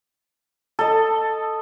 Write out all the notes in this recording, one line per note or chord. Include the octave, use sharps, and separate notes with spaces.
A4 D#5